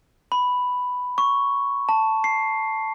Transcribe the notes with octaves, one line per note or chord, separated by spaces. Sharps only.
B5
C#6
A5
C7